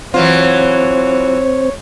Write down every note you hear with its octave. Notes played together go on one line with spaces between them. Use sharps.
E3 F#3 C4 F4 C5 C#5